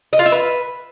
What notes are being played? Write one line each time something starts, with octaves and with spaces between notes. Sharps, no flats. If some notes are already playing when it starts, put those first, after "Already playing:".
D#5
F4
E5
B4